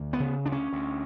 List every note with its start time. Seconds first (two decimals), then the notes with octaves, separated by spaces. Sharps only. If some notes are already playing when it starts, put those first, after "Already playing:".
Already playing: D2
0.13 B3
0.20 C#3
0.45 D2 D4
0.52 C#4
0.73 D2